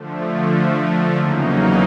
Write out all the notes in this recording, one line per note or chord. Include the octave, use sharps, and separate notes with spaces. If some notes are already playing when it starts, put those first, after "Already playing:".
Already playing: D3 F3 A3
E2 C#3 F#3 A#3 D#4